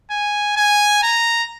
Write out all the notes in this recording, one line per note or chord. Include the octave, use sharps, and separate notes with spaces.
G#5
G#5
A#5